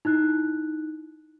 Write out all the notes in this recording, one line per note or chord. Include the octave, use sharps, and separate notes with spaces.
D#4 E4 F#6